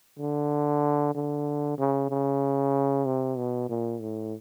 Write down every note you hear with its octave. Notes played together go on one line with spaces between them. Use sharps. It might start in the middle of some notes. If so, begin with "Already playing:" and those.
D3
D3
C#3
C#3
C3
B2
A#2
A2